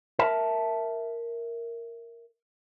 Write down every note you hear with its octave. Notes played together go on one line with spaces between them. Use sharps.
A#4 E5 A5